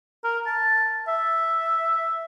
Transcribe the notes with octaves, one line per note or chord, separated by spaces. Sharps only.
A#4
A5
E5